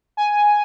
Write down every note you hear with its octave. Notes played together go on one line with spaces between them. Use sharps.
G#5